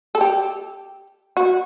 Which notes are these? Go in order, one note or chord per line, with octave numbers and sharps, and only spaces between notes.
A4
G4
F#4